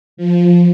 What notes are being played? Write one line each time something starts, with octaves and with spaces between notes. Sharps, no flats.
F3